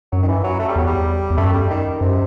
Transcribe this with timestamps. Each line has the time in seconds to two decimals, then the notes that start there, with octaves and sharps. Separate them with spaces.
0.12 F#2 F#3
0.23 D#3
0.28 E3
0.44 F#3
0.59 A3
0.68 G3
0.76 E2 F#3
0.87 G3
1.30 E2
1.38 F#2 A3
1.53 G3
1.70 D#3
2.01 F#2 C3